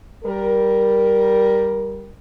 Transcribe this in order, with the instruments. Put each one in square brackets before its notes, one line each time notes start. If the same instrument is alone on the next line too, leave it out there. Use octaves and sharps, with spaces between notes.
[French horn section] G3 A#4